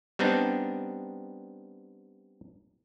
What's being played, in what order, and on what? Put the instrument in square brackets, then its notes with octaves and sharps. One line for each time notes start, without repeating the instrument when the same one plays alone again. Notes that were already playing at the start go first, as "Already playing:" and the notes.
[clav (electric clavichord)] G3 B3 C4 D4 D#4